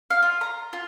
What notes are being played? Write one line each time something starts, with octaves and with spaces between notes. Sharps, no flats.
F5
F4
A#5
F4